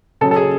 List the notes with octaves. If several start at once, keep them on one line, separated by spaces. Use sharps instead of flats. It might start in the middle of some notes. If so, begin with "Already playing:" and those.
C#3 F#3 A4
A4
G#4